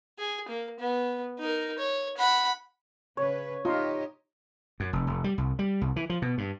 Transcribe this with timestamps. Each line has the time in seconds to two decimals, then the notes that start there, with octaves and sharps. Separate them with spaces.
0.19 G#4
0.49 A#3
0.80 B3
1.40 D#4 A#4
1.78 C#5
2.17 F#5 B5
3.17 C#3 B4 C#5
3.65 D#4 F4 G4 D#5
4.80 F#2
4.93 F1
5.07 F1
5.24 G3
5.38 C2
5.59 G3
5.81 C2
5.96 E3
6.10 F3
6.22 B2
6.38 G2